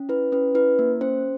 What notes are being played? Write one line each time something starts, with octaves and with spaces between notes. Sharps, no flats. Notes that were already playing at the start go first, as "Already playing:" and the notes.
Already playing: C#4
E4 B4
C#4 B4
E4 B4
A#3
C#4 C5